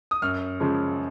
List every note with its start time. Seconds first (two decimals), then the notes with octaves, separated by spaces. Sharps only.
0.11 D#6
0.22 F#2 F6
0.60 C#3 F3 G#3